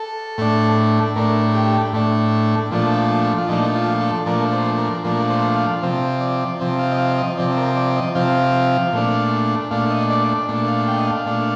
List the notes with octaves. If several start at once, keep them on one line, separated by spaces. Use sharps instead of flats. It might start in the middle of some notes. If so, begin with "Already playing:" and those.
Already playing: A4
A2 A3 D4
A2 A3 D4 A#4
G4
A2 A3 D4
A#2 F3 A3 D4
F4
A#2 F3 A3 D4 D#4
F4
A4
A#2 F3 A3 D4 A#4
C5
A#4
A#2 F3 A3 D4 A#4
C5
F5
C3 F3 C4
D5
C3 F3 C4
F5
D#5
F5
D#5
C3 F3 C4 D5
A#4
D5
D#5
C3 F3 C4 F5
A#2 A3 D4
A#2 A3 D4 F5
D#5
D5
D5
A#2 A3 D4
F5
G5
D#5
F5
A#2 A3 D4